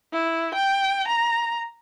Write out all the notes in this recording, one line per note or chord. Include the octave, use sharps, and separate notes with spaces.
E4
G5
A#5